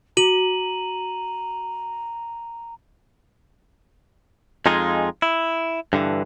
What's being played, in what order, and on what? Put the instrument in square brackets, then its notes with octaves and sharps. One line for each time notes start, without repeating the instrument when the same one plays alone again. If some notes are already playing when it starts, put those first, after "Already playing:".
[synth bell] F#4 [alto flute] A#5 [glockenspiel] D#7 F#7
[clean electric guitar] F2 G#3 D#4 F4 G#4
E4
G2 D3 E3